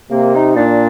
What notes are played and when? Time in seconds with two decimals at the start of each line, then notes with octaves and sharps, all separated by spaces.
0.11 C3 A#3
0.34 D#4
0.56 A#2 D4